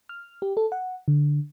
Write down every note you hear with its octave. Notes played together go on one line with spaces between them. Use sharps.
F6
G4
A4
F#5
D3